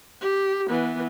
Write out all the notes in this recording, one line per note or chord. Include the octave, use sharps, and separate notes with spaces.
G4
E3 B3